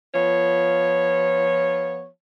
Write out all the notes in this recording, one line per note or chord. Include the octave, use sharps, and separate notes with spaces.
F3 B3 F4 C#5